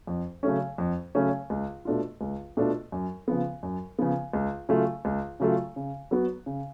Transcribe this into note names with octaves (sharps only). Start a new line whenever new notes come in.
F2
C#3 F#3 A3 C#4
F2
C#3 F#3 A3 C#4
C#2
B2 A3 D4 F4
C#2
B2 A3 D4 F4
F#2
C#3 F3 B3
F#2
C#3 F3 B3
C#2
C#3 F#3 A3 F4
C#2
C#3 F#3 A3 F4
C#3
F#3 B3 F#4
C#3